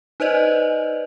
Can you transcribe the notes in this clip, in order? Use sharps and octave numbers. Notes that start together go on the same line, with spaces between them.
D#4 B4 C5 D5 D#5